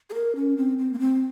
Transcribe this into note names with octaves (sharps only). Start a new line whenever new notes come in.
G#4
A#4
C#4
C4
C4
A#3
C4